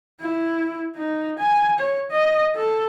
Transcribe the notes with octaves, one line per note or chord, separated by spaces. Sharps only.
E4
D#4
G#5
C#5
D#5
A4